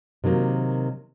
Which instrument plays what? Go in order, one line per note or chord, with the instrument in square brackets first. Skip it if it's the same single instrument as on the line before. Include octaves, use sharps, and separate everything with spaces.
[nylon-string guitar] C3 D#3 F#3 A#3